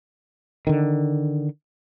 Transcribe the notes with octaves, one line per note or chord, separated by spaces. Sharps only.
D3 D#3